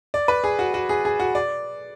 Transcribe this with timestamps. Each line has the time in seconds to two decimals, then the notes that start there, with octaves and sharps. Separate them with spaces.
0.14 D5
0.28 B4
0.44 G#4
0.59 F#4
0.74 F#4
0.89 G#4
1.05 G#4
1.20 F#4
1.35 D5